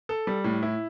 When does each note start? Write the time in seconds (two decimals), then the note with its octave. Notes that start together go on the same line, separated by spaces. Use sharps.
0.09 A4
0.27 G3
0.44 A2
0.63 E4